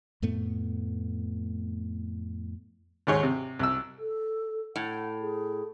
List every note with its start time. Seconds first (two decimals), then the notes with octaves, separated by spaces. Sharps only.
0.22 F2 A2 A3 B3
3.07 D#2 G#2 C#5
3.23 C3
3.59 C2 E6
3.99 A4
4.76 A2 F#5
5.21 G#4